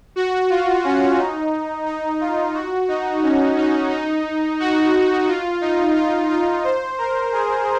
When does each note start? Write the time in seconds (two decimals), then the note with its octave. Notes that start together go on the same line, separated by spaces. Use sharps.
0.16 F#4
0.50 F4
0.84 C#4
1.18 D#4
1.86 D#4
2.21 F4
2.54 F#4
2.88 D#4
3.23 C#4
3.57 D#4
3.91 D#4
4.59 F#4
5.28 F4
5.61 D#4
5.96 F4
6.30 F4
6.64 C5
6.98 A#4
7.32 G#4